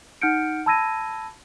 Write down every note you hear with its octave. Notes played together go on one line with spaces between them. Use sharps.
D#4 F#5 F6 G6 C#7 D7
A5 B5 E6 G#6 A#6 D#7